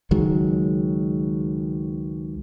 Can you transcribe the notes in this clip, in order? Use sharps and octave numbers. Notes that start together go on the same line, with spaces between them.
C#2 D#3 F#3 G#3